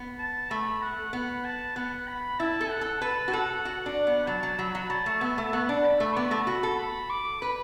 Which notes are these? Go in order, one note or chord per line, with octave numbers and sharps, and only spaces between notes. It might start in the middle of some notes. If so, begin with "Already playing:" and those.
Already playing: B3
A5
A3 B5
F#5
B3 F#5
A5
B3 F#5
B5
E4 A5
A4
F#5
A4
B4 A5
F#4
A4 F#5
F#4
D4
B3
F#3 A5
F#3
F#3 B5
F#3
F#3 A5
A3
B3 E5
A3
B3 F#5
D4
B5
A3
B3 D6
B5
A3 A5
F#4 B5
A4
B5
D6
B4 B5